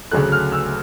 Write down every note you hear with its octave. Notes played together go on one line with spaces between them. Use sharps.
D2 C#3 F#3 A3 F#6
F6
E6